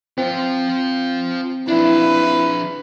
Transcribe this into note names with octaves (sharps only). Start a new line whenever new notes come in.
C4 F4 C5
F3 D4 E4 B4